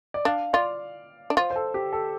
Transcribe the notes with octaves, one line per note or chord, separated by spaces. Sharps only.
D5
D4 F5
F4 D5
D4
F4 C5
C5
A4
G4
A4